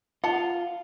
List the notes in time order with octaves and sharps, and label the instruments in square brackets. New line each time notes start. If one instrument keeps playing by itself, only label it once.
[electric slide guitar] F4 [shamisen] F#5 A5